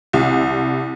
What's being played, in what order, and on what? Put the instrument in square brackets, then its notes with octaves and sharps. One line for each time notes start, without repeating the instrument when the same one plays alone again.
[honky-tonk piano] C2